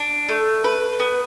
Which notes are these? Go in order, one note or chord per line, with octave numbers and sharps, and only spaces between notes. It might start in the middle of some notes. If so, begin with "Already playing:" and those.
Already playing: D4
A3
B4
B3